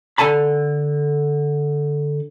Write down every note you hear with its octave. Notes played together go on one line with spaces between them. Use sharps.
D3 A4 G#5 A5 B5